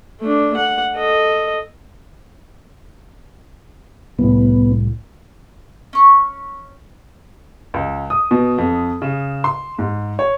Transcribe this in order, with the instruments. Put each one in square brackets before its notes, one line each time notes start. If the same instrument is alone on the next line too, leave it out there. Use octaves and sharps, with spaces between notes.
[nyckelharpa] A3 D4
F#5
A4 D#5
[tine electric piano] C2 A2 [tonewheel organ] B3
[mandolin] C#4 C#6
[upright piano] C#2
D#6
B2
F2
C#3
C6
G#2
C#5